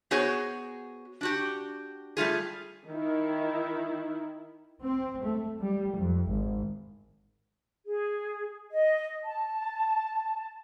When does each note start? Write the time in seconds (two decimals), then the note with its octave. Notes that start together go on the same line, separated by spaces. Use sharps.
0.11 B3 F#4 G#4 C5 C#5
1.21 D4 F#4 G4
2.17 G3 A3 F4 G#4
2.88 D#3 E4
4.83 C4
5.26 A3
5.60 G3
5.95 F2
6.28 G#1
7.86 G#4
8.72 D#5
9.23 A5